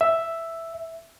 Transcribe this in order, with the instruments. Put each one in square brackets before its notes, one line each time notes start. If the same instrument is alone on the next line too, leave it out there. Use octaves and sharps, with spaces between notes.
[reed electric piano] E5